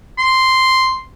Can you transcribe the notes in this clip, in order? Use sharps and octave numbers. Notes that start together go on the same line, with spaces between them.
C6